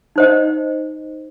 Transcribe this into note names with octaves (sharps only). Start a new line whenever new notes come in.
D#4 C5 D#5